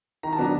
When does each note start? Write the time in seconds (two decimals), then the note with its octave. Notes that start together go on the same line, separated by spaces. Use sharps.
0.23 D#3 A#5
0.33 A5
0.38 F#3 B3 D4 A#5